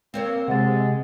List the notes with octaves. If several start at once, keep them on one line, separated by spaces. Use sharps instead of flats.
A#3 C4 C5 C#5
C3 G#3 F#5 A6